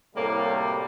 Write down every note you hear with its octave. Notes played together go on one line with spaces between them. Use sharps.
C2 F#2 A2 G3 A#3